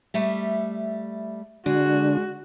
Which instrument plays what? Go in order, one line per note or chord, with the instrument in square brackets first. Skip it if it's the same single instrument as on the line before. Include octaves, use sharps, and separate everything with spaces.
[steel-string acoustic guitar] G3 A3 E5
[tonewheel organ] D3 D4 [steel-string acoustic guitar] G#3 [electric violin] F#4